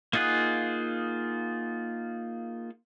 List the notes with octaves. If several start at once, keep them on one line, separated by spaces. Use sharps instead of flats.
A#3 D#4 F4 G#4 F#5